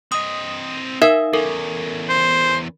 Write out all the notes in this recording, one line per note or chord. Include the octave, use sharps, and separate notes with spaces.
C4 D#5 D#6
D#4 A#4 E5 F5
E2 C#4 A4 A#4
C5